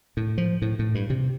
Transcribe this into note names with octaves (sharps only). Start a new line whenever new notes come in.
A2
F3
A2
A2
G2
C3